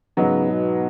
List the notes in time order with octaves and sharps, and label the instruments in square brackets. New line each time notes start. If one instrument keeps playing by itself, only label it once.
[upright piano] G#2 F#3 B3 D#4 [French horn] C#3
[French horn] B2